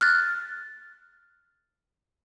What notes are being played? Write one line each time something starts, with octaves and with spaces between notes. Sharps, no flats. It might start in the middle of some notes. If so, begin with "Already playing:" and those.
F6 F#6 A6